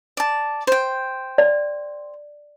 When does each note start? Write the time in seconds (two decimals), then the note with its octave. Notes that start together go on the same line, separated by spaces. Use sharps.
0.17 D5 A5
0.67 C5 G5
1.38 D5